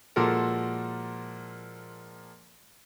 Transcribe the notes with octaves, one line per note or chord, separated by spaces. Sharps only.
A#2 F3 G#3 F#4 A4 A#4